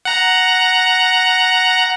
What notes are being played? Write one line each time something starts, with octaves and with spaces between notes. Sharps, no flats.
F#5 A#5